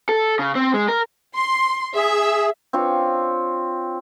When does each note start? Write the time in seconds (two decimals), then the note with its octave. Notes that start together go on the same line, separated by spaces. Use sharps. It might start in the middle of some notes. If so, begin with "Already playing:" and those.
0.09 A4
0.39 C#3
0.55 C4
0.74 G#3
0.88 A#4
1.35 C6
1.96 G#4 E5
2.73 C4 D4 F4 C#5